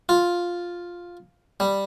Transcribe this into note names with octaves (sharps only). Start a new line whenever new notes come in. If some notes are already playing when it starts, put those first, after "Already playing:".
F4
G3